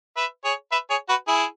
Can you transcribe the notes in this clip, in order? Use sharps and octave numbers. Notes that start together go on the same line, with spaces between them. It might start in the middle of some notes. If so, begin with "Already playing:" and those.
B4 E5
G#4 C#5
B4 E5
G#4 C#5
F#4 B4
E4 G#4